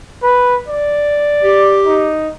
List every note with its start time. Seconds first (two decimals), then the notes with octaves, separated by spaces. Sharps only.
0.23 B4
0.68 D5
1.42 G4
1.86 D#4